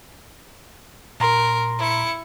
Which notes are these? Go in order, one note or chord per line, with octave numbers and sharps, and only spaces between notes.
A#2 A#4 A#5 C6
E4 C#7